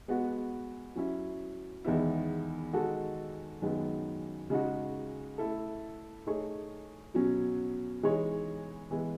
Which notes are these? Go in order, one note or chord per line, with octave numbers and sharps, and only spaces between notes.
G#3 B3 F#4
F#3 C#4 E4
E2 D#3 G#3 B3 E4
D#3 G#3 D#4 F#4 A4
F#2 D#3 G#3 B3
C#3 G#3 D#4 F#4
A3 E4 A4
A3 D#4 G#4 C#5
B2 F#3 C#4
E3 G#3 D#4 G#4 C#5
E3 G#3 B3